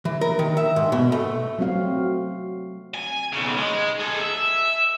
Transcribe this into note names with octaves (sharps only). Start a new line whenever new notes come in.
E3
A#4
D#3
E5
G#2
B2
A3
F#3 A3 C4 F#4 F5
G#5
B1 C#3
G#3
G#4 A4
E5